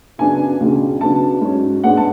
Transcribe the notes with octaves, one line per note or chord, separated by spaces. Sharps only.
F#2 C#3 F#3 B3 D4 G#5
C#2 B2 G#3 D4
C#3 F#3 B3 D4 A5
G#2 F#3 C#4
A2 G#3 B3 D4 F#5
A5